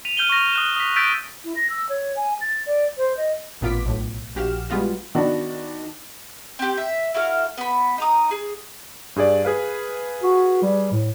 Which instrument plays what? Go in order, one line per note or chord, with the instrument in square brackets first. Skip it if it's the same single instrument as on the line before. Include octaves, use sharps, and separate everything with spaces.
[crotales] B6 D#7 F7
F6 G6 D#7 F#7 G7
C#6 F6 A#6
D#6 F#6 E7
D#6 B6
E6 G6 A6 B6 D7 D#7
[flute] E4
A#6
E6
C#5
G#5
A6
D5
C5
D#5
[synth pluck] A1 A#2 B3 F4 D6 B6
B1 A2
A#1 F#4 G4 F5 F6 E7
G3 G#3 B3 F4 F#4
[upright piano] D#3 B3 D4 F#4
[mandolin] C4 G4
E5
E4 F#4 A4 F5
B3 B5
D#4 A#5 D#6
G#4
[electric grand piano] G2 G#4 D5
G#4 B4 F5
[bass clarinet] F#4
G3
A2